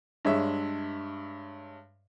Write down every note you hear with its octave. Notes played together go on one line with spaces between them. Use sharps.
G2 G#3 C#5 E5